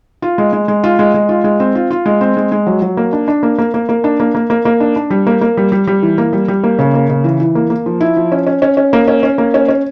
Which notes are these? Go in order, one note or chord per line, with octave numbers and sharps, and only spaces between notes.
F4
G#3
G#3
G#3
F4
G#3
G#3
F4
G#3
C4
F4
F4
G#3
C4
G#3
G#3
F#3
F#3
A#3
D4
D4
A#3
A#3
A#3
A#3
D4
A#3
A#3
A#3
A#3
D4
D4
G3
A#3
A#3
G3
G3
G3
E3
A#3
G3
G3
A#3
C#3
A#3
C#3
E3
E3
A#3
A#3
F3
E4
F3
C#4
C#4
C#4
C#4
A#3
C#4
C#4
A#3
C#4
C#4